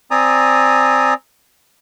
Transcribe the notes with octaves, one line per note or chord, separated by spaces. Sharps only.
C4 D5 G#5 A#5 D#6